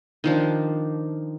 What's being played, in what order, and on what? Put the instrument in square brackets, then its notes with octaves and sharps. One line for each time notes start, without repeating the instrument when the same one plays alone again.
[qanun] D#3 F3 D4